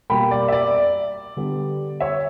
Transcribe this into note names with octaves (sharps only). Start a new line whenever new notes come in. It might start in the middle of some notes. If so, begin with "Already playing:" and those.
B2 G3 A#3 G5 B5
D5
E5
D5
D3 G3 B3
C#5 E5